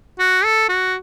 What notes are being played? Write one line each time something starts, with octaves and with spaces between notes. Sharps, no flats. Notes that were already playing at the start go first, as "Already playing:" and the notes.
F#4
A4
F#4